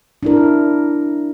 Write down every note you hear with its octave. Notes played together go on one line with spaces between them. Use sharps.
D4 E4 A#4